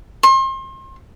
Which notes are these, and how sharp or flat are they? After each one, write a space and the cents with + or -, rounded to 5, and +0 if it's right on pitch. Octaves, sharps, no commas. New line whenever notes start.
C6 +35